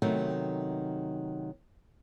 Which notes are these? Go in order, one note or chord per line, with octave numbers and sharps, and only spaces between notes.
C3 D#3 F#3 A3 B3 D#4